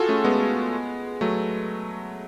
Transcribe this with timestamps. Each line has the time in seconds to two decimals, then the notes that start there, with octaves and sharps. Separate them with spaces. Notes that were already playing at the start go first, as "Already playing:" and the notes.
Already playing: F4 F#4 G#4 A4
0.09 A3 C#4
0.24 G#3 B3
1.21 F#3 A3